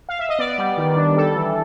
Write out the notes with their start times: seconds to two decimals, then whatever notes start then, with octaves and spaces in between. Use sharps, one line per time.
0.09 F5
0.19 E5
0.29 D#5
0.39 B3 D5
0.58 G3
0.78 D#3
0.97 D4
1.16 G3 A4
1.36 E3